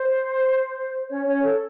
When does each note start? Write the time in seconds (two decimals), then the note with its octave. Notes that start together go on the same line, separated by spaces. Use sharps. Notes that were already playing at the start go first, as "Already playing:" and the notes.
Already playing: C5
1.09 C#4 C#5
1.26 C#4 C#5
1.43 A4